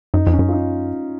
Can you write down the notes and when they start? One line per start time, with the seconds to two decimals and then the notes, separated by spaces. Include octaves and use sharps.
0.14 F#2 D#4
0.27 F2
0.33 C#4
0.39 F#2
0.49 F4
0.53 D#4